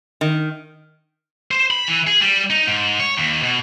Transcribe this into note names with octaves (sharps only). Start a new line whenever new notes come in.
D#3
C5
B5
E3
G#4
G3
D#4
G#2
C#5
D#2
B2